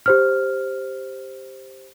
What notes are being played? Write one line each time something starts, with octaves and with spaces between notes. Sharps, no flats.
G4 C5 F6